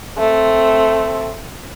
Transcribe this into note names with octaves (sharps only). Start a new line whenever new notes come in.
A3 C4